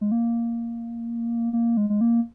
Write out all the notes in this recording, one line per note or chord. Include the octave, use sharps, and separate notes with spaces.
G#3
A#3
A#3
G#3
G#3
A#3